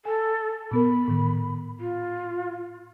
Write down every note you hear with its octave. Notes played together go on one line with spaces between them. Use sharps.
A4 G#5
A#2 B3 A#4 B5
A2 D#3
F4